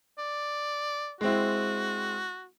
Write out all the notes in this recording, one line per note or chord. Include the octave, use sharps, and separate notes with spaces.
D5
G#3 C4 E4 F#4